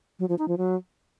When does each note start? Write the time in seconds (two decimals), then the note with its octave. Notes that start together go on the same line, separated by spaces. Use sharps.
0.19 F#3
0.29 F3
0.39 D#4
0.48 F3
0.58 F#3